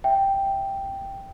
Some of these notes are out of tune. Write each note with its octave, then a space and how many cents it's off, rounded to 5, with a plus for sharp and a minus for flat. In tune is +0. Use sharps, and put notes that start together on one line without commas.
E5 +0 G5 +0